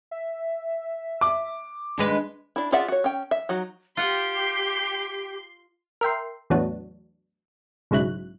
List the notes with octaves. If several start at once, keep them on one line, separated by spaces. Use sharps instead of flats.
E5
D6
D#2 G#3 D4 B4
D4 E4
F4 G#4 D5 E5 F#5
F#4 C#5
C#4 G5
E5
F#3 D#4 F#4
F4 G4 F#5 C6
A#4 E5 G5 C6
E2 A2 F#3 B3 D4
B1 G#2 C#3 F#3 E4 F#6